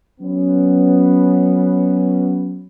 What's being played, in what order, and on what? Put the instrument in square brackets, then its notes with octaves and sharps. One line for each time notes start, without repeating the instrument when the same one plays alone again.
[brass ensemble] F#3 B3 C#4